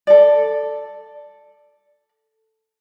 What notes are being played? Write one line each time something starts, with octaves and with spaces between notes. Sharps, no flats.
A4 D5